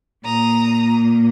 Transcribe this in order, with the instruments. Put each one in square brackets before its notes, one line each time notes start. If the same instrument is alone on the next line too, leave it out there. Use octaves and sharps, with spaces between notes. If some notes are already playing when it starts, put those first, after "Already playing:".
[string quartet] A#2 A#3 A#5 D#6